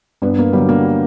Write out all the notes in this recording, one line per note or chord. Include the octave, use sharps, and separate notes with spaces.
G2 B3
A#3
D3 F#3 G3
A#3